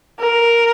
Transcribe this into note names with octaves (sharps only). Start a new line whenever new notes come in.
A#4